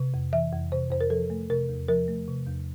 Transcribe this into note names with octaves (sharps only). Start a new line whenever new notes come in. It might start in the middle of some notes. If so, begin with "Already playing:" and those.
Already playing: C3
F2
E3 E5
F2
C3 C5
F2 C5
A#4
F3 A4
A3
C3 A#4
E2
F3 A#4
A3
C3
E2